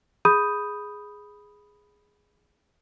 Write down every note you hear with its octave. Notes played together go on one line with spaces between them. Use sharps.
G#4 B5 D#6 G6 D#7